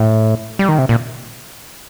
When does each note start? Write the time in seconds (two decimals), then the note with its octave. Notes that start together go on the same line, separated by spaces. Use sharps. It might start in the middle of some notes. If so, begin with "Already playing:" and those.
Already playing: A2
0.59 G3
0.69 D#3
0.78 C3
0.89 A#2